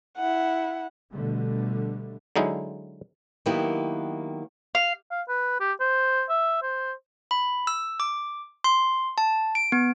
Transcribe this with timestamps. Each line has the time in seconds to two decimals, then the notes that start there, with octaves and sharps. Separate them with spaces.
0.17 E4 F#5
1.10 B2 D3 G3 A3
2.36 D3 F#3 G#3 D#4 E4
3.46 D#3 F#3 A#3 B3 E4 G4
4.75 F5
5.11 F5
5.28 B4
5.60 G4
5.80 C5
6.29 E5
6.62 C5
7.31 B5
7.67 E6
8.00 D6
8.64 C6
9.18 A5
9.55 D7
9.72 B3